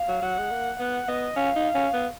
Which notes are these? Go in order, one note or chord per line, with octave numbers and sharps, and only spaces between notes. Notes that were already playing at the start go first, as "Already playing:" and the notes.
Already playing: F5
F#3
F#3 F#5
G#3
A#3
B3 F#5
B3 D#5
C#4 F5
D#4
C#4
B3